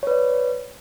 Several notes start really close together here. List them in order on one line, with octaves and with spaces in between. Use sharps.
C#5 B4 D5